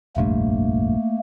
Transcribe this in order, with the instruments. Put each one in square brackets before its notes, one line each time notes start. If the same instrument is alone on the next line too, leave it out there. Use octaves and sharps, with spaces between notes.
[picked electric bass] F1 A#1 G2 [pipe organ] A3 A#3